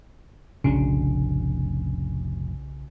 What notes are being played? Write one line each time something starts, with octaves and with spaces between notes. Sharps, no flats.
F1 B1 A2 C#3 D4